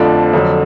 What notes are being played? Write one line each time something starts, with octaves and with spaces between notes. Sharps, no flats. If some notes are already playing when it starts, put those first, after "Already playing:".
Already playing: F2 D3 F3 A3 D4
F2 D3 F#3